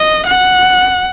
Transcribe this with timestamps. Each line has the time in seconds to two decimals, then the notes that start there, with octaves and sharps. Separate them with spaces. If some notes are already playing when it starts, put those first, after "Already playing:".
Already playing: D#5
0.26 F#5